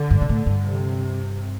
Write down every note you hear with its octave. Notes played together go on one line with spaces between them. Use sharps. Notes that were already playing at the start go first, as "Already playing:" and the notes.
Already playing: D3
G2
B2
A2
G2
C3